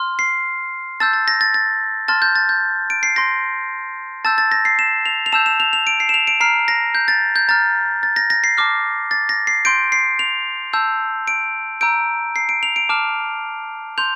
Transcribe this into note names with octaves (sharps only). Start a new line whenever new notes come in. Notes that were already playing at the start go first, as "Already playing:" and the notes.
Already playing: C6 F6
C7
A5 E6 G6 A6
A6
A#6
A6
A6
A5 C6 F6 A6
G6
A6
G6
D7
C7
C6 G6 A#6
A5 E6 G6 A6
A6
A#6
C7
E7
F7
F7
A5 E6 G6 E7
E7
F7
F7
D7
C7
E7
F7
D7
A#5 F6 C7
A#6
G6
A6
G6
A#5 F6 A6
A6
A#6
A#6
C7
A5 D6 F6
A6
A#6
C7
C6 G6 D7
C7
F7
A5 E6 G6
D7
A#5 E6 G6 D7
C7
D7
F7
D7
A5 D6 F6
C6 G6 F7